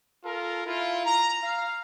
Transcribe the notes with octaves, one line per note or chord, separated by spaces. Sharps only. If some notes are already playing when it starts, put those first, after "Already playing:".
F4 A4 A#4
E4 F4
A#5
F5